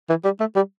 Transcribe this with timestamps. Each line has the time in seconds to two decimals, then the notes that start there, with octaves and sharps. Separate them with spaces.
0.09 E3
0.24 G3
0.40 A3
0.56 G3